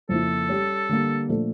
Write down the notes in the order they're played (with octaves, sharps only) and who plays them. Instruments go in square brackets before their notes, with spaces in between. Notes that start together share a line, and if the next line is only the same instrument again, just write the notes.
[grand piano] F2 C#3 F3 A#3 E4 [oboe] A4
[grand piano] G3 C#4 G4 C#5
D3 G3 A#3
A#2 F3 A3 D4 A4